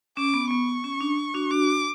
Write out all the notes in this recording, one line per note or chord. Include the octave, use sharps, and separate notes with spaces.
C#4 D6
B3
B3 C#6
C#4
D4
D4 F#4
D4 F#4 D6